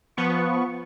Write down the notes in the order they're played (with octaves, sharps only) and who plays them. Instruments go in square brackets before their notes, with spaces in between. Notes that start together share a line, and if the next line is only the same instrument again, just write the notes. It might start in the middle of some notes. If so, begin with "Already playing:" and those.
[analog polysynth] F3 B3 C#6